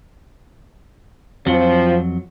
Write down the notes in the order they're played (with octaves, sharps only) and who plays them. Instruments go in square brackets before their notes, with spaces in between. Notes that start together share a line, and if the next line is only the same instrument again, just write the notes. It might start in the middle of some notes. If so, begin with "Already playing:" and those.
[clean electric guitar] F2 F#3 [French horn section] F3 C4